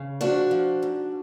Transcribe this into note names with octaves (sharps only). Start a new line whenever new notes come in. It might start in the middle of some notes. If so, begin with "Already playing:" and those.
Already playing: C#3
F3 D4 F#4
F3
G#2